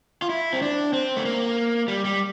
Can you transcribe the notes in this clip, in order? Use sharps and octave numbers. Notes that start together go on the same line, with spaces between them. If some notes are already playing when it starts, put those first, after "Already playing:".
F4
E4
C4
D4
C4
A3
A#3
G3
G3